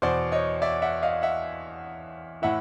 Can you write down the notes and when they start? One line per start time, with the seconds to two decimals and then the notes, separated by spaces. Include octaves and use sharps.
0.02 E2 B2 C5 D5
0.32 C#5 D#5
0.62 D5 E5
0.82 E5 F#5
1.02 D#5 F5
1.22 E5 F#5
2.42 A2 E3 E5 F#5